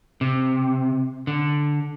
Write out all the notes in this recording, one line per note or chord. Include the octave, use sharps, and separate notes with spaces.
C3
D3